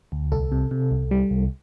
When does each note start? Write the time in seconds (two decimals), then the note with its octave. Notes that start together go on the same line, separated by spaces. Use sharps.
0.12 D2
0.32 C2 A4
0.52 C3
0.71 C3
0.91 C2
1.11 G3
1.30 C2